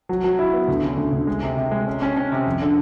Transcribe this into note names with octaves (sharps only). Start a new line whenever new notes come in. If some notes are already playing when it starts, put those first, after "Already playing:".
F#3
F#3
E4
B3
D2
C#3
D2
D2
G#3
C3
C3
G#3
C#4
C#4
C#4
C3
F2
D3